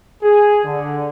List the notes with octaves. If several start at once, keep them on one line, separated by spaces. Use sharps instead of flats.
G#4
D3